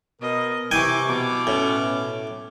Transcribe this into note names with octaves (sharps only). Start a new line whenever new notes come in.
B2 A#4 D#5
C3 E3 G5 G#5 C#6 D6
B2 D6
A2 C#4